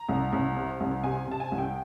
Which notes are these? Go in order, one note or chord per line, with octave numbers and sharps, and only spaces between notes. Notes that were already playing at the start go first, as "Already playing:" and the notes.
Already playing: A#5
C2
C2
C3
C2
C3 G#5
C3 A5
G#5
C2
G5